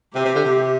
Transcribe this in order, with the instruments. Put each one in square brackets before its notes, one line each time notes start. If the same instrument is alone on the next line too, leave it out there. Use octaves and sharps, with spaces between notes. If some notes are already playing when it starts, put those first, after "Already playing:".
[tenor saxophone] C3 [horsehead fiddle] G4
[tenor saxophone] C3
D3
C3